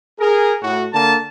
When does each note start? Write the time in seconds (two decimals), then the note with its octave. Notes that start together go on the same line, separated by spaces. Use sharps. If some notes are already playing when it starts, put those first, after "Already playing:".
0.19 G#4 A#4
0.62 A2 F#4
0.92 D3 A#3 A5